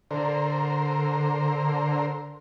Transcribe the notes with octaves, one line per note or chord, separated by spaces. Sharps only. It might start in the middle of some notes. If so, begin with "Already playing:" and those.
D3 A#4 C5